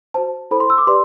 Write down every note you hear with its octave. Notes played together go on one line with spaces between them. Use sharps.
F#4 C5 A5
E4 A4 C5 B5
C6
E6
D6
G4 B4 D5 C6